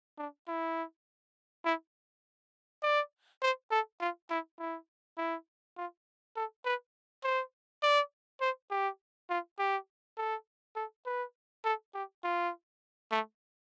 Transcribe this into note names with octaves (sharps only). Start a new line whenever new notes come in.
D4
E4
E4
D5
C5
A4
F4
E4
E4
E4
F4
A4
B4
C5
D5
C5
G4
F4
G4
A4
A4
B4
A4
G4
F4
A3